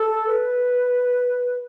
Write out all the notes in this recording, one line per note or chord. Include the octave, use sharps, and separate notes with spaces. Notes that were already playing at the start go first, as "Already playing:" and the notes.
Already playing: A4
B4